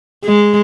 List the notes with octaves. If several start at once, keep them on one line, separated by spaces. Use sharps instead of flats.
G#3